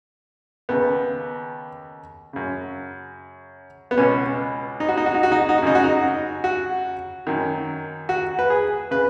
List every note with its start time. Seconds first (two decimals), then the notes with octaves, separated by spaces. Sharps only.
0.69 D#2 C#3 B3
2.33 F#2 C#3
3.91 B3
3.98 C#2 B2 C#4
4.80 D#4
4.89 F#4
4.97 D#4
5.06 F#4
5.14 D#4
5.23 F#4
5.32 D#4
5.41 F#4
5.49 D#4
5.58 F#4
5.62 F#2 C#3 D#4
5.75 F#4
5.84 D#4
6.44 F#4
7.27 F#2 D#3
8.09 F#4
8.39 B4
8.50 G#4
8.91 C#3 B4